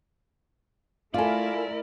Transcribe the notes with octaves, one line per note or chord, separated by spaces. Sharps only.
A3 E4 F4 A4 A#4 D5 F5 G#5